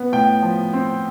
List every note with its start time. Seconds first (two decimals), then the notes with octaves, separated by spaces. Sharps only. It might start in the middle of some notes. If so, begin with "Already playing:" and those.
Already playing: B3
0.13 A2 G5
0.43 F3
0.73 C4